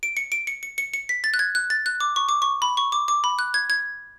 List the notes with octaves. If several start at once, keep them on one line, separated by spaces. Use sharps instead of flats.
D7
C#7
D7
C#7
C#7
C#7
C#7
B6
A6
F#6
G#6
F#6
A6
F#6
D6
C#6
D6
C#6
B5
C#6
D6
D6
B5
F#6
G#6
G#6